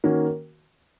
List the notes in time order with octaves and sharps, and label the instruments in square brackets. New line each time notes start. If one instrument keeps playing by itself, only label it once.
[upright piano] D#3 A#3 C#4 F#4